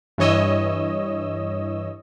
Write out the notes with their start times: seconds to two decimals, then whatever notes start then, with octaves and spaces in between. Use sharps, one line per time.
0.18 G2 E3 C#5 D#5 E6